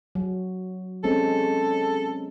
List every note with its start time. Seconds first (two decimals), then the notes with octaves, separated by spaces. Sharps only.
0.15 F#3
1.04 G#3 C4 C#4 A4